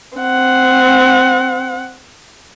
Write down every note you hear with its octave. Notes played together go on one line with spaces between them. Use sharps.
C4 F#5